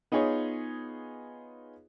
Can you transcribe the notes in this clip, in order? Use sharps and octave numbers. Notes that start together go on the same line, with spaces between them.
B3 D#4 F4 G#4 C#5